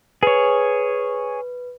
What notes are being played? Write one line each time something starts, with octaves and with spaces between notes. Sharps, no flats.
G#4 B4 C#5